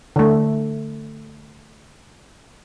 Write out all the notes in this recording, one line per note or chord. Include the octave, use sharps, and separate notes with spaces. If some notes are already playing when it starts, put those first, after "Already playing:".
D3 A3